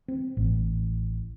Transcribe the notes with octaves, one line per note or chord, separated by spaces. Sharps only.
C4
A1